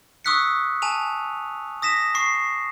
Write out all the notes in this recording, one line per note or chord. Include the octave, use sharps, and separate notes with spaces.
C#6 D#6 E6 F#6 B6 C#7
G#5 A5 D#7 F7
D#6 A#6 B6 E7
C#6 C7